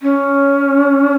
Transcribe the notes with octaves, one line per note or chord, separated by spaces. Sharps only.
C#4